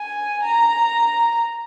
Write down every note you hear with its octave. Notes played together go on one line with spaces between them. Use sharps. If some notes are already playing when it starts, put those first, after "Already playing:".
Already playing: G#5
A#5